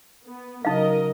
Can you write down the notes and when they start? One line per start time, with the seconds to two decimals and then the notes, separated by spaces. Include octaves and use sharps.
0.25 B3
0.65 C#3 F#3 D#4 A#4 D#5 F5